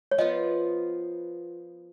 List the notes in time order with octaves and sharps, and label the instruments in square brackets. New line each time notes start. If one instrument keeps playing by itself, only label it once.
[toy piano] C#5
[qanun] F3 B3 F4 [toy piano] D#5